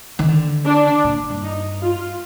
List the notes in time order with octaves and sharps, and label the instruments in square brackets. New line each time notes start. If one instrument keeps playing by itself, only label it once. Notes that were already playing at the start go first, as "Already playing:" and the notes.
[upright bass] D#3
D3
[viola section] D4
[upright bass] A#2
G2
[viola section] D#4
F4